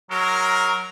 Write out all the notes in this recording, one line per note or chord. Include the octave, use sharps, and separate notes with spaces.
F#3 G#3 A#4